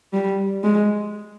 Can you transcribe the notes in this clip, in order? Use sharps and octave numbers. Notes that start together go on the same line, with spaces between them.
G3
G#3